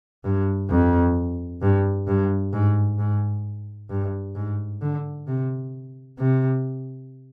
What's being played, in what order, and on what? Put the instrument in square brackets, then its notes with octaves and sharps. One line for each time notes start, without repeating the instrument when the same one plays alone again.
[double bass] G2
F2
G2
G2
G#2
G#2
G2
G#2
D3
C3
C3